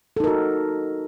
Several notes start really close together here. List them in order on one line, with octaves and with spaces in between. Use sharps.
A4 D#4 A#4 F#4